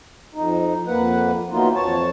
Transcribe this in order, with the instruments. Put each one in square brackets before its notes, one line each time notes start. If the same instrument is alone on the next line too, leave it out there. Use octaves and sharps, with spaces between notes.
[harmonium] F2 D#4
F2 A#3 B4 F#5
E3 F#3 A#3 B3 D#4 F4
F2 C#5 A5